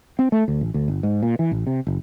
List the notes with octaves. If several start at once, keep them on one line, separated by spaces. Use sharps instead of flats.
C4
A3
D2
A1
D2
G1
G#2
A#2
E3
A1
C3
F#1